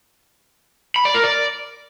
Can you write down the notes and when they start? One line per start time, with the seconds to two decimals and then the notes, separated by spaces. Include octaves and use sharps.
0.96 B5
1.05 D5
1.14 A#4
1.24 D5